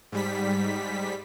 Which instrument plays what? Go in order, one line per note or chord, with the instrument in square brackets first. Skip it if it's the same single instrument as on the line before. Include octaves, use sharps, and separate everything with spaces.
[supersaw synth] G#2 G3 B6